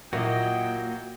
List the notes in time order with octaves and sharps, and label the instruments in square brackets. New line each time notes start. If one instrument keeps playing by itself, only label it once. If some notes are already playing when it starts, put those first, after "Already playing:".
[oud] A#2 [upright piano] F#3 A#3 E4 [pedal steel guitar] F#4 D#5 [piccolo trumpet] G5